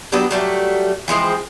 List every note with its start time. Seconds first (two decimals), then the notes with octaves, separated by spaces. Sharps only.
0.12 F#3 B3 D4 G4
0.31 F#3 G3 A3
1.08 E3 F3 G#3 C4